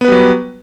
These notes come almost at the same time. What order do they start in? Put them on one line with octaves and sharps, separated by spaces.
B3 B4 G3 F#3